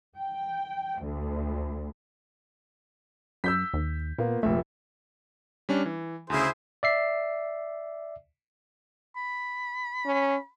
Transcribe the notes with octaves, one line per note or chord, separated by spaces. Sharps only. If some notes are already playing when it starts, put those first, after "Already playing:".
G5
D2
F#2 E6 G6 B6
D#2
A#2 A#3 B3 F4
F1 A#1 A3 E5
G3 C#4 D4
E3
D2 C#3 E4 G#4 C5
D5 E5 C7
B5
C#4